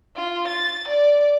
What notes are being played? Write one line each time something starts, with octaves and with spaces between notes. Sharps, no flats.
F4
A6
D5